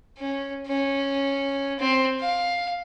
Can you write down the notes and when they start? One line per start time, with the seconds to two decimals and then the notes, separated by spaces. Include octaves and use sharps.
0.18 C#4
0.67 C#4
1.80 C4
2.20 F5